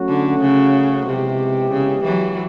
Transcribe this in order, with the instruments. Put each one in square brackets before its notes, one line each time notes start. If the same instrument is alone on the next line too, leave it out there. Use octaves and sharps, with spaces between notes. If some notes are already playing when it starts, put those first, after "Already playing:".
Already playing: [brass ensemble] F#3 A3 C#4 F#4
[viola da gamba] D3
C#3
[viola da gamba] C3 [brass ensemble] F3 G#3 B3 E4 G4
[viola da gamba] C#3
E3 F#3